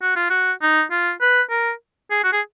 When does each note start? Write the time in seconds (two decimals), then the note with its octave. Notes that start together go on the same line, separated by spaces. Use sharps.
0.02 F#4
0.16 F4
0.30 F#4
0.62 D#4
0.91 F4
1.21 B4
1.50 A#4
2.11 G#4
2.24 F#4
2.32 G#4